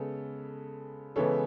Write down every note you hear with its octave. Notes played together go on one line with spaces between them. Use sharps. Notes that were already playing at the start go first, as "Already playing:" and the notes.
Already playing: C#3 G#3 B3 A4
C#3 E3 G#3 B3 A4 C#5